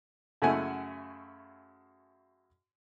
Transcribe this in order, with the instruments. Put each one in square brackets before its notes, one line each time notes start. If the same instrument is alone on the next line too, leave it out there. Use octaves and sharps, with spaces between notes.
[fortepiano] F#2 C#3 A3 E4 F#5 G#5